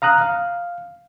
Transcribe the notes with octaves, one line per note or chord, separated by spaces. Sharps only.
F5 A#5 D#6 F#6
F5